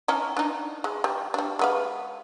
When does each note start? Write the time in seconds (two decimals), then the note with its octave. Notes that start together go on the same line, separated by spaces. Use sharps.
0.08 C#4 D#4 E4
0.37 D4 D#4
0.84 G#3
1.04 G3
1.34 G3 D4
1.59 G#3 B3 F5